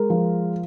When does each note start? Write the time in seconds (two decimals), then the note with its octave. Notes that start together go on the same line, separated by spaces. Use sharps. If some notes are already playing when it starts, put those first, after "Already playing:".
Already playing: G#3 A#4
0.10 F3